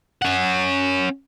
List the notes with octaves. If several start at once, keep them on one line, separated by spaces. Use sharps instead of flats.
C#4 F#5